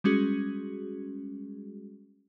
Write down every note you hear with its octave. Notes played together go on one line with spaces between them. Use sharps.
G3 G#3 C#4 F#4 G#4